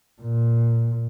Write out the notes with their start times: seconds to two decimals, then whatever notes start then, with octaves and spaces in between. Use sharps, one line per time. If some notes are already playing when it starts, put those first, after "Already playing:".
0.22 A#2